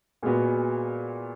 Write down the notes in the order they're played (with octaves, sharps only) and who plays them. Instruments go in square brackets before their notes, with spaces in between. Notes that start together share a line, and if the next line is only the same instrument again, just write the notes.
[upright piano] A#2 G#3 B3 F#4